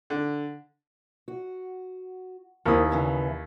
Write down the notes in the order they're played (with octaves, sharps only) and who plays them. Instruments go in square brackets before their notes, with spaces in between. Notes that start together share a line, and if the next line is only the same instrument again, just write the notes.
[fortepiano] D3
[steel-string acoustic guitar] F#4
[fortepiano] D#2 E4 D#6 [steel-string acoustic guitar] A#3 C4
[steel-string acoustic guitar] E2 C#3 E3